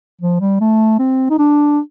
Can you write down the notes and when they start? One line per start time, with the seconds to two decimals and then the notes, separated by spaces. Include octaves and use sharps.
0.21 F3
0.41 G3
0.60 A3
0.99 C4
1.30 D#4
1.38 D4